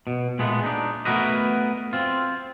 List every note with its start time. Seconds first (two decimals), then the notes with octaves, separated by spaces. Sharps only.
0.07 B2
0.39 A#2 G#3 A3 B3
0.64 D4 D#4
1.05 A3 B3 F#4 A#4 B4 D#5
1.93 C4 F4